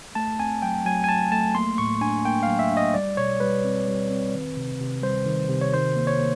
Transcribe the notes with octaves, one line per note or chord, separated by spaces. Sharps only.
A3 A5
C4 G#5
F#3 G5
F#3 G#5
G#5
F#3 A5
A3 A5
A#3 C6
A2 C#6
D4 G#5
A#3 G5
F#3 F5
E5
D4
D#5
G3 D5
B2 C#5
G3 B4
C4
G3
C4
D#3
C3
C3
G3 C5
D#3
C3
C#5
D#3 C5
A#3
C#5
A#3